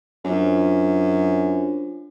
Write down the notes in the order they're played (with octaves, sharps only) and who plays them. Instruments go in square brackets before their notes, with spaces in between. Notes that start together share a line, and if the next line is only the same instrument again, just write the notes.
[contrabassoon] F#2 [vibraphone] D4 F4 C5